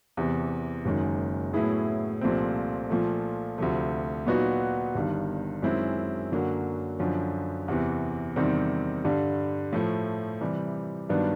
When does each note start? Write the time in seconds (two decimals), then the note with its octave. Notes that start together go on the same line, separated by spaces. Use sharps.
0.17 E2 C3 E3
0.85 F#1 F#2 D#3 G#3
1.54 A2 F#3 B3 E4 G#4
2.21 C2 A#2 F3 A3 C4
2.90 A#2 F3 A3
3.58 D2 C3 F3 A3
4.27 A#2 F#3 B3 D#4 F#4
4.95 G1 G2 D#3
5.62 F#2 D#3 G#3 C4 E4
6.32 F#2 D3 F#3 A#3
6.99 F#2 D3 F3
7.68 E2 C3 E3
8.36 E2 C3 D#3 G3 C4
9.05 G2 D3 G3
9.73 A2 F3 A3
10.41 C3 E3 G3
11.09 G2 D#3 F#3 B3 D4